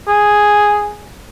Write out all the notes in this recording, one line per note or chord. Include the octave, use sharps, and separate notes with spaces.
G#4